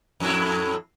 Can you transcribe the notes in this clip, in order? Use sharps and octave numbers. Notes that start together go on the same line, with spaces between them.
F2 A2 E4